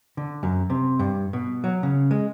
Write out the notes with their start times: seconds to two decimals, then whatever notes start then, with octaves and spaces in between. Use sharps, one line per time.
0.17 D3
0.43 F#2
0.70 C3
0.99 G2
1.33 B2
1.64 F#3
1.83 C#3
2.11 G#3